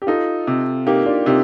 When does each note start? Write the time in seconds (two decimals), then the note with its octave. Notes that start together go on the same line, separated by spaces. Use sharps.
0.02 G4
0.07 D#4 F4 A4
0.47 C3
0.87 A#3 D#4 G4
1.06 D4 F4
1.26 C3 D#4 G4